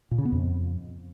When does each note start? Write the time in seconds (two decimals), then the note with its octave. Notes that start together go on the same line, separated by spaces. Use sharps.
0.11 A#2
0.18 C#3
0.25 B3
0.32 F2